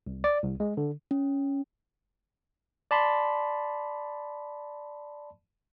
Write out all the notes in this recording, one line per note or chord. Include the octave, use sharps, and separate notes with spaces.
C2
D5
C2
G#3
D3
C#4
D5 A5 B5 C6